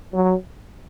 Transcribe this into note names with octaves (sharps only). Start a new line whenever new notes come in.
F#3